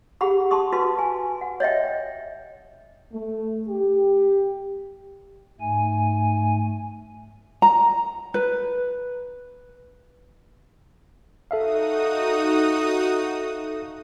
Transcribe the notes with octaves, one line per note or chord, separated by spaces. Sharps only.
G4 G#4 F#5 B5 C#6
A5 C6 C#6 D#6
F#4 A4 B4 A5 C6 C#6
G#5
F#5
C#5 D#5 E5 G5
A3
G4
G#2 A3 G#5
A#5
B4
D#4 F#4 A4 E5 F5 D#6